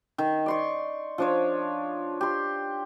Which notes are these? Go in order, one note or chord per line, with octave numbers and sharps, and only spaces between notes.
D#3
D5 C6 C#6
F3 D4 C#5
G4 C6